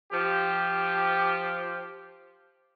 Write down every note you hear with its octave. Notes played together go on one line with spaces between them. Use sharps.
F3 G4